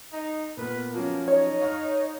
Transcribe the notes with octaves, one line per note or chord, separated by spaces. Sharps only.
D#4
A#2 A#3 B3 B4
F3 F#3 A#3 C#4
D#4 C#5
F5 C#6 F6